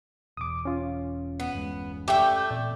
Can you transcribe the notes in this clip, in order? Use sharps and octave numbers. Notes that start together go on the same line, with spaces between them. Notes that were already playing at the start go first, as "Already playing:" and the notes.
E1 E2 D6 D#6
C#4 F4
B3
G1 E2 G#3
A3 G4 E5 G5
A1 A#2 C4 D5